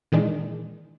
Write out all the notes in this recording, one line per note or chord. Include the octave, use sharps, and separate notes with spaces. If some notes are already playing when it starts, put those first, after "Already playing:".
A#2 D#3 E3 G#3 D4